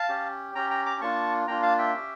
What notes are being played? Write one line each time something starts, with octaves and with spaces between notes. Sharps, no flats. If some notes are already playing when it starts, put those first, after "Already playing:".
Already playing: F5 A5
C#4 G4
C#4 G4 G5 A#5
G5 A#5
A#5 D6
A#3 D4 F4 A5 C#6
A#3 D4 F4 G5 A#5
F5 A5
E5 G5
C#4 G4